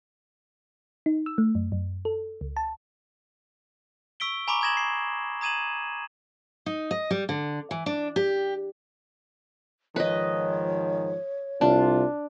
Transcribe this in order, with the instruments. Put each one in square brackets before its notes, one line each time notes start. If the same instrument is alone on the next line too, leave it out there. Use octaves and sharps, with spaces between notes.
[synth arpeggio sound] D#4
E6
A3
F#2
F#2
A4
C#2
A5
[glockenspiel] C#6 E6 B6 D7 G7
G#5 A#5 B5 C#6 D6
G#5 D#6 G#6 A#6 E7 F#7
C7
A#5 D#6 G#6 D#7 E7 F#7
[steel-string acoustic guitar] D#4
D#5
G3
D3
E3
D4
G4
[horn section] G#2 D#3 F3 [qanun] B4 D#5 [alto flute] C#5
[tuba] C2 [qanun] D4 [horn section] F4